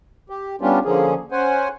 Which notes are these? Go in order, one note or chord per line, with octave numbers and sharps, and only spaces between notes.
G4
G3 B3 C#4 D4 F4 G4
D3 F3 A#3 C#4 G#4
C#4 C5 F#5 G#5